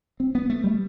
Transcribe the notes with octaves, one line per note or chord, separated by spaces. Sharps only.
C4
B3
A3
G3